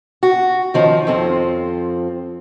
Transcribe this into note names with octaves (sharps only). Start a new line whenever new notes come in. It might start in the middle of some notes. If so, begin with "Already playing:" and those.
F#4
D#3 F3 C#4
F2 F3 C4